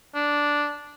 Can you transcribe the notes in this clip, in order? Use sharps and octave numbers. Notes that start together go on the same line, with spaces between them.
D4